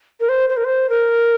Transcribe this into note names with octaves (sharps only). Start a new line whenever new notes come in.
A#4
C5
C5
A#4
C5
A#4